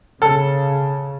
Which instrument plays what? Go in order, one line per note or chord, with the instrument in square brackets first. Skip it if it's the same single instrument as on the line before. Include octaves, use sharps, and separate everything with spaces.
[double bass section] C#3 [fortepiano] A4